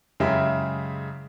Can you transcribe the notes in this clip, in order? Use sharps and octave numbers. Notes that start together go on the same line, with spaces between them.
F#2 C#3 G#3 E4 G4 E5